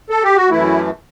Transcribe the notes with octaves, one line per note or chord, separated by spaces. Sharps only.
A4
G4
F#4
F#2 E3 A3 E4